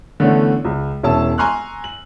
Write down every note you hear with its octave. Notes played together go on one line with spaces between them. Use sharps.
D3 E3 A3 B3 C#4
C#2
E1 B3 C#4 E4 A5 E6
G#5 A#5 C6 C#6 F6 F#6
F#7